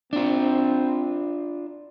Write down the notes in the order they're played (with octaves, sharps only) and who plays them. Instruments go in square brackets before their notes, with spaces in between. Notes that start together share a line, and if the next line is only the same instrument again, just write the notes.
[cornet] C4 [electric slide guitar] D4 F4